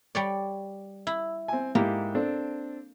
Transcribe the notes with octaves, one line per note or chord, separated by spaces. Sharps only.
G3 C#5 D5
E4
C4 G#5
G#2 A#3 E4 G4
C4 D4 A4